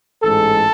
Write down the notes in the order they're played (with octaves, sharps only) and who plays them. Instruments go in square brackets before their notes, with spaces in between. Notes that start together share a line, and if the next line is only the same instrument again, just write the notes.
[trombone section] A1 G#2 G#3 A4